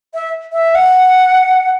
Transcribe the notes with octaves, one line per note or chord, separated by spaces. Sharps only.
E5
E5
F#5